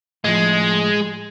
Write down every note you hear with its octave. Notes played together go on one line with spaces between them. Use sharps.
A2 F3 G#3